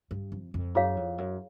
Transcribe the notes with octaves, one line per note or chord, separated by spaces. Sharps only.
G2
F2
F2
F#2 E4 G#4 C#5 F5
F2
F#2